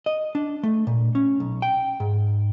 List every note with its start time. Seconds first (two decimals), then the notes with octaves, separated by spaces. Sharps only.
0.06 D#5
0.35 D4
0.63 A3
0.87 A#2
1.15 C#4
1.40 B1
1.62 G5
2.00 G#2